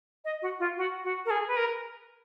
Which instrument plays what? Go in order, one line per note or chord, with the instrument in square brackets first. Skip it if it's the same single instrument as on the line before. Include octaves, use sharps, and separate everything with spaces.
[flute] D#5
F#4
F4
F#4
F#4
A#4
G#4
B4
A#4